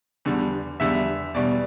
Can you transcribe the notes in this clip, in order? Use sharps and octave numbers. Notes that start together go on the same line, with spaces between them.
E2 D3 G3
E2 D3 G3 E5
E2 B2 G3 D5